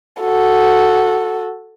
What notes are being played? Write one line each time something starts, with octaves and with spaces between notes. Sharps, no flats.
F#4 A4